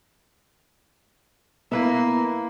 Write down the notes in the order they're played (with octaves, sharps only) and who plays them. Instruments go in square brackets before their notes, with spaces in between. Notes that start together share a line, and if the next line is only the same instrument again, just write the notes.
[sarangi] A#3 [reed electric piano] B3 [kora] E4 B4 E5